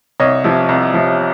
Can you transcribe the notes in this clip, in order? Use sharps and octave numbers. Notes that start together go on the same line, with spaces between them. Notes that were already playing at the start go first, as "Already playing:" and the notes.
C2 C#5 D#5
C3 F3
C2
C3 F3